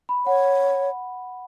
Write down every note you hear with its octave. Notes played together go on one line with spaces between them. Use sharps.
B5
C#5 F#5